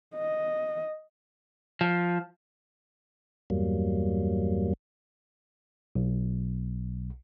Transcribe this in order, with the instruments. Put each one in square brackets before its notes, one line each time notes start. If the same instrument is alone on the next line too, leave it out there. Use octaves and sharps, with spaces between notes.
[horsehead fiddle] D#5
[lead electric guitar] F3
[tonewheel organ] E2 G2 F#3 G3 A#3
[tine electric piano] B1